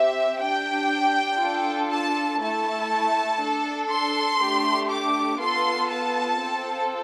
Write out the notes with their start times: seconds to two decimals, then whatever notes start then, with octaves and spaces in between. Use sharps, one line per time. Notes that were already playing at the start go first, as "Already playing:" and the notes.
Already playing: C4 G4 E5
0.42 D4 G4 G5
1.42 D4 F4 A4
1.91 A5
2.41 A3 E4 A4 A5
3.41 D4 A4
3.91 C6
4.40 A3 D4 G4
4.90 D6
5.39 B3 F4 A4 C6
5.90 A5
6.39 C4 F4 A4